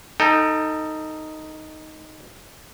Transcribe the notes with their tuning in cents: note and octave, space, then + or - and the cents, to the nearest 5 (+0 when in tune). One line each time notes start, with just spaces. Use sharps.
D#4 +0 A4 +25 G5 +35